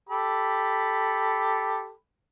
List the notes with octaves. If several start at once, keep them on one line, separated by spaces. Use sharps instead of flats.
G4 A4 B5